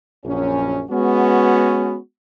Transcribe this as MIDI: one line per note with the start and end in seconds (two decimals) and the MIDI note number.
0.25 0.83 34
0.25 0.83 42
0.25 0.83 61
0.91 1.96 56
0.91 1.96 59
0.91 1.96 61
0.91 1.96 66